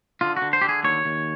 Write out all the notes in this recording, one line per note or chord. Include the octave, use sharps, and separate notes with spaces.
D3 F4
F#4
D3
C5
D3 G4
G#4
D#2 C#5
D#2